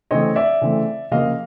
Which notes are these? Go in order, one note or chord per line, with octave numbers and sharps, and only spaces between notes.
C#3 E3 A3 C4 C#5 D#5
D5 E5
C#3 E3 A3 C4
C#3 F3 A#3 D#5 F5